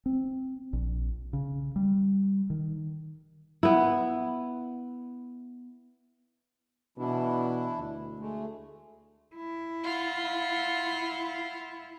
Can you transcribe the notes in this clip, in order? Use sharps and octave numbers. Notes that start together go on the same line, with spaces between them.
C4
A#1
C#3
G3
D#3
B3 E4
B2 E3 D4 E4
D2
G#3 A3
E4
F4 F#5